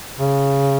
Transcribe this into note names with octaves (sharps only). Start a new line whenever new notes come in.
C#3